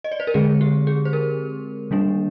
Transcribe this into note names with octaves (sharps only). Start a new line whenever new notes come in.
D#5
D5
C5
A#4
D3 G#3 C4 G#4
G4
G#4
C5
A#4
D#3 G3 A#3 D4